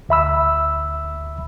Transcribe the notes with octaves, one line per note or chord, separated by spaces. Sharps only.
D2 E5 B5 E6